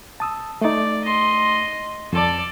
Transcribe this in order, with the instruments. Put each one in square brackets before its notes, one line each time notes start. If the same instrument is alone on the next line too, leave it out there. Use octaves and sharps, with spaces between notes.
[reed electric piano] A5 D#6 E6
[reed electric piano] A3 D#4 [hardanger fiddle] D5
[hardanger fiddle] D#5 C6
[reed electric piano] F2 [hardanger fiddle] A4 D5